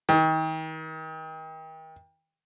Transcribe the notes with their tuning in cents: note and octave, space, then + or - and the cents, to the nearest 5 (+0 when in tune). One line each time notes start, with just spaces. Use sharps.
D#3 +35